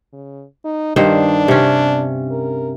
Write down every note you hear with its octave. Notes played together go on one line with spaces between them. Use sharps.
C#3
D#4
G2 D#3 D4 C5
C3 C#4
A#4